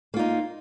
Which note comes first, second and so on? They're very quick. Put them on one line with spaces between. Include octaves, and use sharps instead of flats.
A#3 F4 D#4